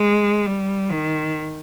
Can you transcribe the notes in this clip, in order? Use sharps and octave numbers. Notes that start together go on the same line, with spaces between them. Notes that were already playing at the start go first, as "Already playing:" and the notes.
Already playing: G#3
G3
D#3